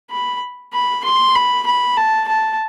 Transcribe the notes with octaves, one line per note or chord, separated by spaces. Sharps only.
B5
B5
C6
B5
B5
A5
A5